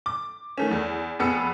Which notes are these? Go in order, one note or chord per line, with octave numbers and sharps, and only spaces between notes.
D6
D#3 A3 C#4
E2
F1 F2 B3 G#4 E6 C#7